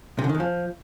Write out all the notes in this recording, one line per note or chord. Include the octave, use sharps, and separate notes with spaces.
C3
D3
D#3
E2
F3